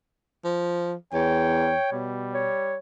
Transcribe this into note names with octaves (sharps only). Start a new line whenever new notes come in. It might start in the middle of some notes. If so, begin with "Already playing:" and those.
F3
E2 C#5 G5
B2 G3
C#5